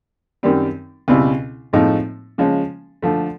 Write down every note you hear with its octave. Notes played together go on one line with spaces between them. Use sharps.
F#2 D#3 G3 C4
C#2 B2 G3 C4 E4
A2 F3 G#3 C4 D#4
C#3 F3 G#3 C#4
D3 F3 A3